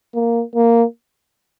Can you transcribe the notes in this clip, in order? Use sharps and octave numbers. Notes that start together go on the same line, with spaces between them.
A#3
A#3